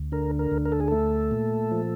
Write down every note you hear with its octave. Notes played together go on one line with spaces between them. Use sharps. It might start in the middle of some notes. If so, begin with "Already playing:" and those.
Already playing: D2
D3 A#4
A#4
D2
A#4
A4
G#4
A3 A4
A#2
F3